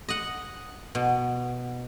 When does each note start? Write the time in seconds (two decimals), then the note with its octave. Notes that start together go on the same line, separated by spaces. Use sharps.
0.09 D#5 F#5
0.95 B2